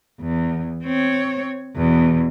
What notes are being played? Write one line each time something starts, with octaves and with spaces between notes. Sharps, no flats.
E2
C4 C#5
E2 B2